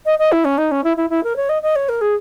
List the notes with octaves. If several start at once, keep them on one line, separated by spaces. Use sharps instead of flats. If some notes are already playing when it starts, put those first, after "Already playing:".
D#5
D#5
E4
C#4
D#4
C#4
E4
E4
E4
A#4
C#5
D#5
D#5
C#5
A#4
G#4